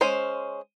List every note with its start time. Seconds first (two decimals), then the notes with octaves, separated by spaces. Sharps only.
0.01 G#3 C#4 C5